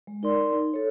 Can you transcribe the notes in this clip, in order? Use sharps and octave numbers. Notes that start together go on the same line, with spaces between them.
G#3
D#4 A#4 D5 C6
D#4
A4 C#5